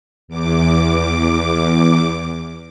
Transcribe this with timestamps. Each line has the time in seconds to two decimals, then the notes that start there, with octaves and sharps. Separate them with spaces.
0.28 E2 D6